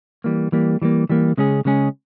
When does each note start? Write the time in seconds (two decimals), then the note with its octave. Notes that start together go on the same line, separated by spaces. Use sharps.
0.24 E3 G3 A#3
0.52 E3 G3 A#3
0.82 E3 G3 A#3
1.09 E3 G3 A#3
1.38 C#3 G#3 C#4 G#4
1.65 C#3 G#3 C#4 G#4